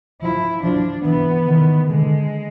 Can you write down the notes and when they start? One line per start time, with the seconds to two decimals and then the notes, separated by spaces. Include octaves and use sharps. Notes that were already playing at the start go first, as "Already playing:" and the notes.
0.21 F3 E4
0.63 F3 D4
1.04 E3 B3
1.47 D#3
1.88 D3 G#3